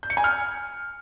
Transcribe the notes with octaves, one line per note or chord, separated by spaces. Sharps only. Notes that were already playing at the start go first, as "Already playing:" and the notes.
G6
C#7
G#5
F6